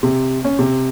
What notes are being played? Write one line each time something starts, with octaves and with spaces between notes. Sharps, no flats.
C3
C#4
C3